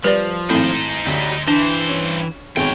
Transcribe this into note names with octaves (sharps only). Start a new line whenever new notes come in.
F3 G3 B4 D5
G#1 A3 C4 D#4 E4 C5
D2 F#3 G3
G2 E3 D4 C5
C#4
G#1 E2 B2 G#4 C#5 G5